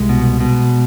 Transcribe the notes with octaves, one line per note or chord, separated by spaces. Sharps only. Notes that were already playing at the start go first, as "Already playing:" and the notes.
Already playing: C2 G#3
B2
B2